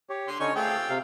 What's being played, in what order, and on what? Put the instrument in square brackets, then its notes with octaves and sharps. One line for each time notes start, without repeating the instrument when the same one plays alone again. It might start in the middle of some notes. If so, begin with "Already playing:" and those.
[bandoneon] G4 C#5
[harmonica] D3 C6
[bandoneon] D3 C#4 D#4 [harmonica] C#5 G#5 C#6
[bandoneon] A3 G#4 [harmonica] C4 F4 G4
[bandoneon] C3 F5